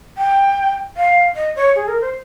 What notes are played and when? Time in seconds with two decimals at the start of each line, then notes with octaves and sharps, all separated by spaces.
0.18 G5
0.97 F5
1.35 D#5
1.56 C#5
1.75 G#4
1.88 A#4
2.01 C5